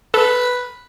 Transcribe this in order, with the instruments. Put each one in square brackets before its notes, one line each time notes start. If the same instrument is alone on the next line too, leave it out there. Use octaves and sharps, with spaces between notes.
[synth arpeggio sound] A4 [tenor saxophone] B4